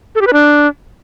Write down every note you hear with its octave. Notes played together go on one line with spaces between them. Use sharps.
A4
G4
B4
D4